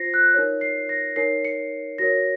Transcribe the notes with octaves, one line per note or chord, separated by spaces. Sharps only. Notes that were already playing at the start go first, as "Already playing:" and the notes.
Already playing: F4 C5 A#6 C7
F#6
D#4 A#4 C#5
C7
A#6
D#4 A#4 C#5 C7
C#7
F#4 A#4 C#5 A#6